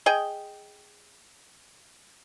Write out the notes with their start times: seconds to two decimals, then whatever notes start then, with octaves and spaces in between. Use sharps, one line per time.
0.06 G#4 D#5 G5